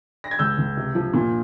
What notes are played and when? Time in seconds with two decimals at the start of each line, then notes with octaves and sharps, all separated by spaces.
0.24 A#6
0.31 G#6
0.39 C#2 E6 G6
0.58 C#2
0.77 C3
0.95 F3
1.13 A#2